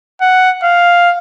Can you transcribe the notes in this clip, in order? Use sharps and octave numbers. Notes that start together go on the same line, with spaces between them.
F#5
F5